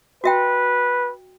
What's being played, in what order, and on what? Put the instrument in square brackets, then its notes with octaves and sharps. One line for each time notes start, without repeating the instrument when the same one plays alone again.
[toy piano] F#4 E5 G5 [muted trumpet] B4